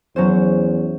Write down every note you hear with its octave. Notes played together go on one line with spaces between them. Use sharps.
E2 F#3 C#4 C5